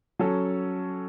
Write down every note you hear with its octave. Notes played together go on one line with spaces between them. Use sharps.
F#3 C#4 A4